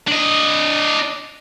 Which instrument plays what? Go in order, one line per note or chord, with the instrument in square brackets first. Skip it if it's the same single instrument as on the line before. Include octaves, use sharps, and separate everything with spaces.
[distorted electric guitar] D4 D#5